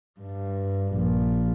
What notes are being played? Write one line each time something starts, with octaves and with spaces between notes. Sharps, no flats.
G2
A#1